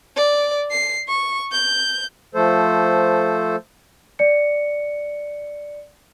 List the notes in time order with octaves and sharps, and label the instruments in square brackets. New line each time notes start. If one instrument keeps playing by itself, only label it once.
[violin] D5
C7
C#6
G6
[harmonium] F3 A3 A4 C5
[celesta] D5 C#7